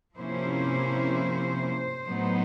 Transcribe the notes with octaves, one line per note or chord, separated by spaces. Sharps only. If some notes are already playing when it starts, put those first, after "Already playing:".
C3 F3 A#3 C#4 E4 C5
A2 F#3 B3 D#4